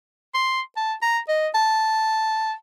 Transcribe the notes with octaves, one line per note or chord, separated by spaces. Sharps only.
C6
A5
A#5
D#5
A5